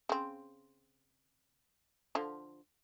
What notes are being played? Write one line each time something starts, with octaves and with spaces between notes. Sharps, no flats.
C#3 C4
D3 F3